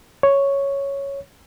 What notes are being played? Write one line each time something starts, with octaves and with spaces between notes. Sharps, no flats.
C#5